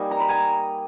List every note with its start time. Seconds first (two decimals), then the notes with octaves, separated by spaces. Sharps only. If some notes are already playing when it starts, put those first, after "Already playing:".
Already playing: G3 A#3 D#4 G#5
0.11 A#5
0.20 B5
0.29 G#5 A#5